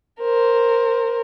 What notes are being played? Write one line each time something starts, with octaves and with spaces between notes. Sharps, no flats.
A#4 C5